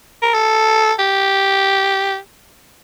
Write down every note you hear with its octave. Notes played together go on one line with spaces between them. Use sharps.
A#4
A4
G4